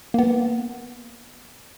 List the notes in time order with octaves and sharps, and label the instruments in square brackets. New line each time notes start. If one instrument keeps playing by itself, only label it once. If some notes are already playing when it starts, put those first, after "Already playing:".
[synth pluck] A#3 B3